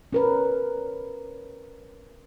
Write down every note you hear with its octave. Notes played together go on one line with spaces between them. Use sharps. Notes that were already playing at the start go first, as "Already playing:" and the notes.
C#4 A#4 B4